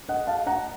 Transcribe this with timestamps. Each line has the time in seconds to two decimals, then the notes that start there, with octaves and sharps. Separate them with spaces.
0.09 D#5 F#5
0.27 F5 A5
0.47 F#5 A#5